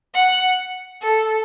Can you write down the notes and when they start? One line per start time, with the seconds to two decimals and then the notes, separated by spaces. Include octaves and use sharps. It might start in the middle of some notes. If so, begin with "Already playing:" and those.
0.14 F#5
1.02 A4